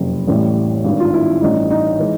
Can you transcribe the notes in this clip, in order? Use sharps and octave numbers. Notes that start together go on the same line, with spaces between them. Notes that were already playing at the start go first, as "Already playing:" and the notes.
Already playing: F#1 F2 C3
A1 A2 E3 G3
G#1 G2 D#3
F4
E4
A1 G2 E3 G3 D#4
D#4
E3 G#3